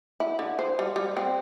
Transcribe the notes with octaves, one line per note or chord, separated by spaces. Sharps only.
E4
D3
C5
G3
G3
C4